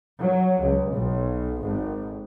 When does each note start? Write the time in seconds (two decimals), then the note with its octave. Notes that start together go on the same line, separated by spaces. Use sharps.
0.20 F#3
0.62 C#2
0.93 B1
1.63 G#1